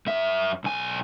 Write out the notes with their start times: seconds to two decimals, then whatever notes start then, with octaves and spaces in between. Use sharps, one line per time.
0.07 F#2 E5
0.64 B1 G#5